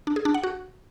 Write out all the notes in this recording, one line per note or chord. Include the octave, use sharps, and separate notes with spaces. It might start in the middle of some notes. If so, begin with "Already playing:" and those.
D4
G#4
D4
F#5
F#4